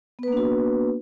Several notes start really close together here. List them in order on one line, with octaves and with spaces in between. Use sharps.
B3 B4 A#3 D4 F#4